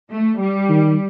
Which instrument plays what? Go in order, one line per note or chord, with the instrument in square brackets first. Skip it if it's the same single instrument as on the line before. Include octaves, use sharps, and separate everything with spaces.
[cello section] A3
G3
[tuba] D#3